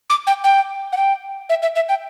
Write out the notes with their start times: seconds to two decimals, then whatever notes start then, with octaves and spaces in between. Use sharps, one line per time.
0.10 D6
0.27 G5
0.44 G5
0.92 F#5
0.97 G5
1.50 E5
1.62 E5
1.75 E5
1.89 G5